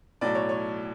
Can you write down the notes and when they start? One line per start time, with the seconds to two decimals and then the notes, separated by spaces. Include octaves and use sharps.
0.21 B1 A2 F#3 D5
0.35 C#5
0.49 C#5